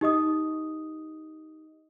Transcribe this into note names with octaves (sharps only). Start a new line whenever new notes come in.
D#4 G4 D#5 D#6